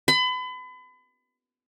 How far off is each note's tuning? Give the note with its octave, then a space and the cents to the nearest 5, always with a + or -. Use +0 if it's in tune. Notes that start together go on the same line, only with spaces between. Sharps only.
B5 +35